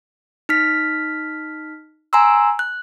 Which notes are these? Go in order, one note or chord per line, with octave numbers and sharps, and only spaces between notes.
D#4 F6 B6
G#5 A#5 C6 E6
F#6